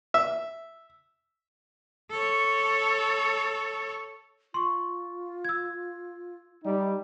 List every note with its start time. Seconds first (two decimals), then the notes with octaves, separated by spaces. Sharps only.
0.14 E5
2.10 A4 C#5
4.54 F4 C6 C#6
5.45 E6 G#6
6.63 G3 D#4